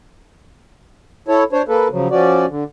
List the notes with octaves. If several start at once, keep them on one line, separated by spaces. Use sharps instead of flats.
E4 A4 C#5
D4 C5 C#5
A#3 A4 B4
C#3 F3 F#3
F3 C#4 F#4 D5
D3